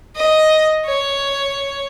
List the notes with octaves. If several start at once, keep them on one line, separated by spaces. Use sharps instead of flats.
D#5
C#5